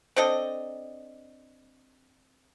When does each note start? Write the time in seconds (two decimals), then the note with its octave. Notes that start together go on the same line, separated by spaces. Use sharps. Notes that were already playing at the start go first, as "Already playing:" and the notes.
0.16 C4 D4 A4 D#5